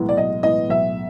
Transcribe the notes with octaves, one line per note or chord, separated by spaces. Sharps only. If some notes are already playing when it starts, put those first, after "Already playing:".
Already playing: B1 A2 E3 G#3 B3
D5
B1 D#5
A2 E3 G#3 B3 D#5
B1 E5